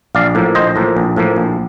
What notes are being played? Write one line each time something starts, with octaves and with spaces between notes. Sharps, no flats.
A#1 D5 F5
A2 F3 A#3
A#1 C5 D#5
A2 F3 A#3
A#1
A2 F3 A#3
A#1